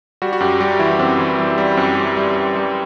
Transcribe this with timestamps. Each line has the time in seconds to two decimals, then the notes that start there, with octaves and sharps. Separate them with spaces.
0.22 G3 F#4
0.33 F#4
0.40 F#2 G4
0.60 G3 G4
0.79 E3 E4
0.99 F#2 C4
1.19 E3
1.38 G3
1.58 G3
1.77 F#2 C4
1.97 G3
2.17 G3
2.36 G3
2.55 G3